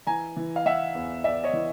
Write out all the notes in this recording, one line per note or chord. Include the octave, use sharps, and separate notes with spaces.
E3 G#5 A#5
E3
F5
E3 E5 F#5
E2
E2 D5 E5
C#5 D#5
E3